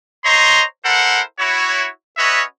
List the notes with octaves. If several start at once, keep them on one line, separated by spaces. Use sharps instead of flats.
C5 C#5 D#5 A#5 C6
E4 A4 A#4 C5 F#5
E4 F#4 C#5
C#4 F#4 B4 C#5 D#5 E5